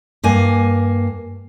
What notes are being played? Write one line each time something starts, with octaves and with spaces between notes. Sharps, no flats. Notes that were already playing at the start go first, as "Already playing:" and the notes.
G2 A#3 G#5